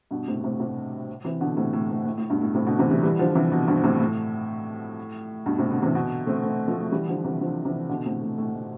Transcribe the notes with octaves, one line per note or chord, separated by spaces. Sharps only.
G2 B2
A2 C3
A2 C3
A2 C3
C3 E3
B2 D3
A2 C3
A2
A2
A2
A2
G2 B2
A2
A2 C3
B2 D3
C3 E3
E3 G3
E3 G3
D3 F3
C3 E3
B2 D3
G2 B2
A2 C3
A2
G2 B2
A2 C3
B2 D3
C3 E3
B2 D3
A3 C4
A3 C4
F3 A3
A3
E3 G3
D3 F3
C3 E3
D3 F3
C3 E3
B2 D3
A2 C3
A2
A2
A2